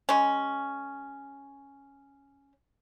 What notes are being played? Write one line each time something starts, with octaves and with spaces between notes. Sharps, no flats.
G#3 C#4